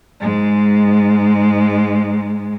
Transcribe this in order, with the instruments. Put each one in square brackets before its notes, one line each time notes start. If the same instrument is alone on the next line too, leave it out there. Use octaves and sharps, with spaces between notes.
[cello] G#2 G#3